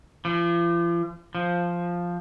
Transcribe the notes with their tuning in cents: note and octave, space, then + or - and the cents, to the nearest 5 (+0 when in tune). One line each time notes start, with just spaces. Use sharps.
F3 -40
F3 +0